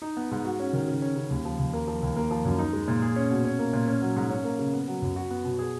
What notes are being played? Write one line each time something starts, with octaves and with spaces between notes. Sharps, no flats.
D#4
B3
G#2
F#4
C#4
D#3
C#3
C#4
C#3
D#2
F3
D#2
A#3
F3
D#2
A#3
F3
F#2
D#4
G#3
A#2
G#4
C#4
B2
C#4
A#3
A#2
C#4
F#3
G#2
C#4
A#3
C#3
B3
F#3
F#2
F#4
B3
B2
G#4